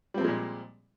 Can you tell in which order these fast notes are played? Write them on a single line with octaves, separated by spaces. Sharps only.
G3 C4 F3 G#3 A#2